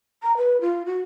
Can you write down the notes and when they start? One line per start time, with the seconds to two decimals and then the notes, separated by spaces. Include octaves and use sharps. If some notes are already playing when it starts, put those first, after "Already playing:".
0.23 A#5
0.37 B4
0.61 F4
0.86 F#4